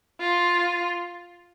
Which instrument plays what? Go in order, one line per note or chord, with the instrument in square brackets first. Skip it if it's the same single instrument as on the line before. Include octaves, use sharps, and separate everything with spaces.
[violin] F4